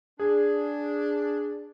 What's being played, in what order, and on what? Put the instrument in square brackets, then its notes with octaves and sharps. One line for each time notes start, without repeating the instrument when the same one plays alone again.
[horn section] D4 [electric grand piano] G#4